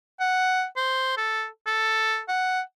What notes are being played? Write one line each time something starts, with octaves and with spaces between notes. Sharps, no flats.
F#5
C5
A4
A4
F#5